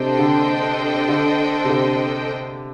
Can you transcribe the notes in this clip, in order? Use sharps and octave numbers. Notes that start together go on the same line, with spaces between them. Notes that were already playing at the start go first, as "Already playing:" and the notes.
Already playing: C3 D4 A4 C5 D#5 G5
D3
D3
C3
D3